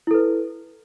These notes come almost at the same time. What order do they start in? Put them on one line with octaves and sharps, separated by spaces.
E4 A4 B4